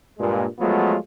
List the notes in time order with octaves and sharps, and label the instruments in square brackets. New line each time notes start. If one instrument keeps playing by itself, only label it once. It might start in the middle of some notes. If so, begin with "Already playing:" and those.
[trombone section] G2 A#2 G#3
F3 F#3 G#3 A3 B3 F4